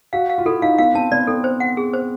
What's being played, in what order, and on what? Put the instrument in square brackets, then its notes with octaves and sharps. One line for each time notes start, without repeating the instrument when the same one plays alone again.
[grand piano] F#4 [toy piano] F5
[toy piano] F5
[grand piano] F4
[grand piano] E4 [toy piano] A4
[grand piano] D#4 [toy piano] F5
[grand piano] B3 [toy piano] F5
[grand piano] C4 [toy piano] A5
[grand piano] B3 [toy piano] D5
[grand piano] C4 [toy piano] A4
[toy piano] C5
F#5
G#4
C5